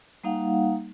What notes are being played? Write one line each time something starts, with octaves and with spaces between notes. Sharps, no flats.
G3 A#3 D#4 F5 F#5